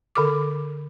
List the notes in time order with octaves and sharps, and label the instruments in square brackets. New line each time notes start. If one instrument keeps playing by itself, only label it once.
[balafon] D3 A4 D6